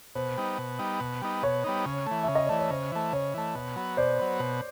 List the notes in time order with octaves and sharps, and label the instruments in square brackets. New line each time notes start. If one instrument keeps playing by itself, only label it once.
[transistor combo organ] B2 [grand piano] C5
[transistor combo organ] G3 B3 D#4
B2
G3 B3 D#4
B2
G3 B3 D#4
[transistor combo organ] B2 [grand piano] C#5
[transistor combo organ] G3 B3 D#4
C#3
E3 A3
[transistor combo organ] C#3 [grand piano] E5
[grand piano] D#5
[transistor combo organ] E3 A3 [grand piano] D5
[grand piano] C#5
[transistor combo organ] C#3 [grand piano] C5
[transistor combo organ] E3 A3
[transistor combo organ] C#3 [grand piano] C#5
[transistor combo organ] E3 A3
B2
F#3 B3
[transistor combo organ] B2 [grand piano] C5 D5
[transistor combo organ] F#3 B3
B2